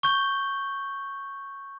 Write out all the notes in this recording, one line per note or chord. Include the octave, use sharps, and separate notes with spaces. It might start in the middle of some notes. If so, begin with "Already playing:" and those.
C#6 G6 G7